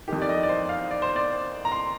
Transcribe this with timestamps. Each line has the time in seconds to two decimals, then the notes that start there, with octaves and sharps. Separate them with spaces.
0.08 F2 D#3 G4
0.22 D5
0.29 D#5
0.43 D5
0.49 C5
0.69 F5
0.91 D5
1.02 C5
1.16 D5
1.65 A#5
1.72 C6